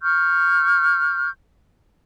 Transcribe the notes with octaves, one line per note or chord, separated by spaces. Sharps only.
C#6 F6 G6